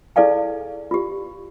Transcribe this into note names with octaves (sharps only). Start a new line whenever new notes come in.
E4 G#4 A4 D5 F5 G#5
F4 G4